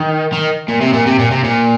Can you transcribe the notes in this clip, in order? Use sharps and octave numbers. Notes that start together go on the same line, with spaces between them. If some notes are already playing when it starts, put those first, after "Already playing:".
Already playing: D#3
D#3
A#2
C3
A#2
C3
A#2
C3
A#2